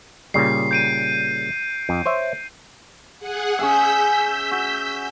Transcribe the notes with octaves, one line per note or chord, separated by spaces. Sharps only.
A#2 C#3 G3 C7
G6 D7 D#7
F2
C5 C#5 E5
G#4 F#5
C#4 G#4 E5 E6 G6 B6
F#4